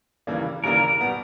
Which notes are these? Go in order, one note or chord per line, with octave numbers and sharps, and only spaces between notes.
D#2 C#3 E3 G3 A#3
D#2 C#3 E3 G3 A#3 A#4
B2 G3 B3